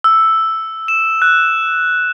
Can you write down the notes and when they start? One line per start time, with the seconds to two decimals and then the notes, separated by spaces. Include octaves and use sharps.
0.04 E6
0.88 E7
1.22 F#6